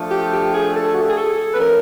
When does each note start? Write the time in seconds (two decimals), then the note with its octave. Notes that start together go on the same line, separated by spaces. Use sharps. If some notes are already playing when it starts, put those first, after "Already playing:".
Already playing: F3 A3 D4
0.10 G4
0.32 G4
0.53 G#4
0.74 A4
0.95 F#4
1.02 G4
1.09 G#4
1.17 A4
1.53 B4
1.59 F3 A3 C#4 A#4